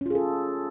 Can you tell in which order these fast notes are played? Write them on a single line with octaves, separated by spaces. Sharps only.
C#4 F4 G#4 A4